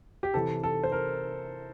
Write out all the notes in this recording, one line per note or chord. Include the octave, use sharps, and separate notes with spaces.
G4
C3 E3 A4
A4
C5
A#4